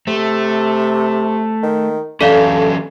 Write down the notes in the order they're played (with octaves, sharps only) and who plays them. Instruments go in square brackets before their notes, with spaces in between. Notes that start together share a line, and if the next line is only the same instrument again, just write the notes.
[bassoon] C3 [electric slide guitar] A3
[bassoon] D#3
[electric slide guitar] E3 F#3 C#4 [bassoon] A3 [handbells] A4 D5 F5